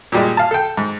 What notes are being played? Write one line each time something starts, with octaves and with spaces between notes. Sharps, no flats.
A#2 G3 G#3
F5 A5
A4 G5
G#2